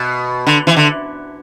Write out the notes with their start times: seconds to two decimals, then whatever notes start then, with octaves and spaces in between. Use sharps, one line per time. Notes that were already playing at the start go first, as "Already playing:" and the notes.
Already playing: B2
0.47 D3
0.67 E3
0.77 D3